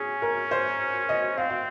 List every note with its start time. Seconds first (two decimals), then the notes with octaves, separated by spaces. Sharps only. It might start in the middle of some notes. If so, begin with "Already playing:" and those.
Already playing: C#4 G#4
0.22 A#4
0.51 C5
1.09 D#5
1.38 C4 F5
1.49 F5